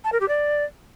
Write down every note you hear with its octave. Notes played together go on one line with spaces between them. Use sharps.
A5
A#4
G4
D5